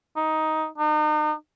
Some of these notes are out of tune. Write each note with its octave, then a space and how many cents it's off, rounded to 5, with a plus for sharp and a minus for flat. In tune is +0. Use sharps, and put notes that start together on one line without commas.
D#4 +10
D#4 -40